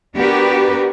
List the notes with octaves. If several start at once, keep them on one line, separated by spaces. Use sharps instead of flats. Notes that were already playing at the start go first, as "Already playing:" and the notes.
B3 D4 F#4 G4 A#4 B4